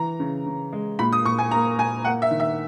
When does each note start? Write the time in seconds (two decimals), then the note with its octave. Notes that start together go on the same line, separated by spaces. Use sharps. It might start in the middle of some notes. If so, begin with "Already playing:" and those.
Already playing: E3 A#5
0.20 C#3
0.46 C#3
0.72 G#3
0.99 A#2 B5
1.12 D#6
1.25 A#2 C#6
1.39 G#5
1.51 A#3 A#5
1.78 A#2 G#5
2.05 A#3 F#5
2.22 E5
2.31 D#3
2.40 E5